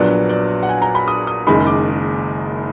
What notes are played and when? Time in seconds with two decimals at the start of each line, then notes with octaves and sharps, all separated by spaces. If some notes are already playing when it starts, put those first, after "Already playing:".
Already playing: A#1 A#2 F#3 B3 D4 D5
0.29 D5
0.63 F#5
0.69 G#5
0.82 A#5
0.95 B5
1.08 D#6
1.27 D#6
1.47 F#1 F#2 D#3 G#3 B5
1.67 D6